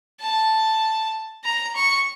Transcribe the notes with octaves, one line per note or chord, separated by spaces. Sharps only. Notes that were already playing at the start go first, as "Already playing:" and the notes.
A5
A#5
C#6